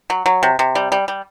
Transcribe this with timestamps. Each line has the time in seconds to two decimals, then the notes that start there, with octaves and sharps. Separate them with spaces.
0.10 F#3
0.26 F#3
0.43 C3
0.59 C3
0.75 G3
0.92 G3
1.08 G3